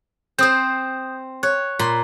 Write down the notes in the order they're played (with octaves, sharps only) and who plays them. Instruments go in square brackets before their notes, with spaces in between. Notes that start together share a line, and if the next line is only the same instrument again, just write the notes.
[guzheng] C4 C5 [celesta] D#6 G6
[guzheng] C#5 [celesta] F#6
[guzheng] A#2 B5 C6